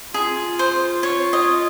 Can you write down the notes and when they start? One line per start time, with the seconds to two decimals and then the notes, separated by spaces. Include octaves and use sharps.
0.14 F4 G#4
0.59 C5
1.03 C#5
1.33 D#5